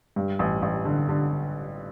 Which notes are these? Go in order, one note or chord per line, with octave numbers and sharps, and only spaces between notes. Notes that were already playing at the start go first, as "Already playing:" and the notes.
G2
A1
A1
D3
D3